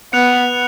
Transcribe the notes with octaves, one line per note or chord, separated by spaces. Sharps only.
B3 F#6 C#7 F7